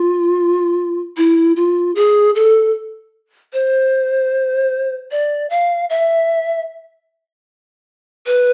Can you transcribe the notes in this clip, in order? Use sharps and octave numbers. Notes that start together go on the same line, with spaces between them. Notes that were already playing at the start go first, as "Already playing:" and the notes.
Already playing: F4
E4
F4
G#4
A4
C5
D5
F5
E5
B4